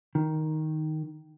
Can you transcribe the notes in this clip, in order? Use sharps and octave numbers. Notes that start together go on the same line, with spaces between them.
D#3